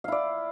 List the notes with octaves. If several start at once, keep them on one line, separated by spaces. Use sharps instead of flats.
E4 D5 F5